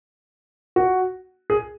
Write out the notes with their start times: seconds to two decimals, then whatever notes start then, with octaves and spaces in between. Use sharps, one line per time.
0.76 F#4
1.50 G#4